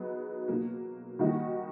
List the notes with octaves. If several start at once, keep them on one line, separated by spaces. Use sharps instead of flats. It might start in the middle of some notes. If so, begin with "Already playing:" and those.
Already playing: F#3 B3 D#4 G#4
B2 F#3 A#3
D#3 G3 A#3 D#4 F#4